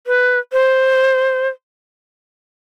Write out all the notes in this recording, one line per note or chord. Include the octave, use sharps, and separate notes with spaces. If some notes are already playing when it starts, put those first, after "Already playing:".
B4
C5